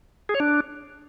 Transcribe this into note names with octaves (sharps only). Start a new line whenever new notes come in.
G#4
C#5
D4